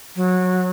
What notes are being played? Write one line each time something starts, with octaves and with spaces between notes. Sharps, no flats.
F#3